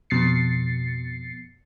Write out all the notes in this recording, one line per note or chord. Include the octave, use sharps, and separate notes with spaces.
F2 B2 A6 C7 C#7